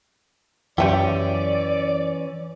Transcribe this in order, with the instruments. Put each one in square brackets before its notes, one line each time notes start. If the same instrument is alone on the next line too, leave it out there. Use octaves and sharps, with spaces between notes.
[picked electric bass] F#2 [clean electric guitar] E3 C#4 [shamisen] G4 E5 G5 [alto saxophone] D5